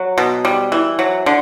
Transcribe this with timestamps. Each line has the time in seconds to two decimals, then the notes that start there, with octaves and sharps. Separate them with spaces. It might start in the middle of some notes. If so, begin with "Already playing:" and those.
Already playing: F#3
0.18 B2
0.45 G3
0.72 E3
0.99 F#3
1.26 D3